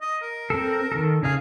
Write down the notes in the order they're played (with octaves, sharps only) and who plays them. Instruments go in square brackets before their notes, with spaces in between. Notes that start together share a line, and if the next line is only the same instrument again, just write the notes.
[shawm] D#5
A#4
[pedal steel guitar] C4 A4
D#3 A4
[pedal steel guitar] C#3 F5 [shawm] G#4